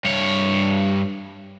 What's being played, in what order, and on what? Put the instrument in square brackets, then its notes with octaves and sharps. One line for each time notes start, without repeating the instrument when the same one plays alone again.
[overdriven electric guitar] G2 C#5